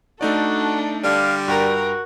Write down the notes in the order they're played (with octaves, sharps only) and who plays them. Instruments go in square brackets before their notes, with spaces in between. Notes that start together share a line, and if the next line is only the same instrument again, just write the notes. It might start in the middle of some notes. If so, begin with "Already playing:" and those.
[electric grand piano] A3 D#4 D5 [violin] D4 A4 [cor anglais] F#4
[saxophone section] D3 G3 [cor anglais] F5
[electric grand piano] G2 G5 A#5 [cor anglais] F#4 [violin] A#4